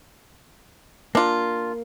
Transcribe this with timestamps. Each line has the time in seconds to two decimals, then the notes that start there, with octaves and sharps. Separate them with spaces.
1.15 A#3 D4 F4